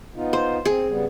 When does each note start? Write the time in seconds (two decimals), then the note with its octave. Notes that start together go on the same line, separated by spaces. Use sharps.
0.16 B3 D#4 F4
0.33 C5
0.65 C4 G#4
0.89 C#3 G3 B3